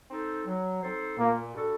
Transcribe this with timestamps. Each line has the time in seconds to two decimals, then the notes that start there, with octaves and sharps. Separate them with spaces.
0.09 C4 D#4 A4 C5
0.46 F#3
0.82 C4 D#4 A4 C5
1.18 A#2 A#3
1.55 G3 D4 F#4 A4